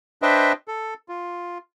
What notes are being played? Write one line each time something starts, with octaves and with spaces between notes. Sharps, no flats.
D4 B4 C5 D#5 E5 G5
A4
F4